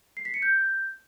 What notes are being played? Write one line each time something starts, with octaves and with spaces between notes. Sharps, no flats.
C7
B6
C#7
G6